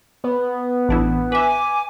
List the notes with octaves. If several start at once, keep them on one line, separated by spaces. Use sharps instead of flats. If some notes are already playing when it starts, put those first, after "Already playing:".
B3
A1 D4 E4
B4 E5 G#5 D6